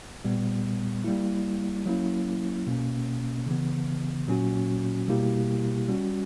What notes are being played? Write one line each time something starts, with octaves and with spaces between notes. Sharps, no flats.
A#2 G3 B3
G3 A#3 E4
F#3 A#3 C#4 E4
B2 A#3 C#4
C#3 E3 B3
A#2 F#3 A#3 C#4 F#4
B2 G3 A#3 E4 G4
G3 C#4 F#4